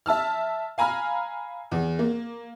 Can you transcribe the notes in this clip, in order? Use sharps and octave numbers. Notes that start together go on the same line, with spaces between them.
E5 A5 E6 F6
F5 G#5 A#5 B5 F6
E2
A#3